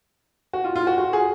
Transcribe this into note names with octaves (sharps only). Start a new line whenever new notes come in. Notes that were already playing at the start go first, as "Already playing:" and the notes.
F#4
F4
F4
F#4
F#4
G#4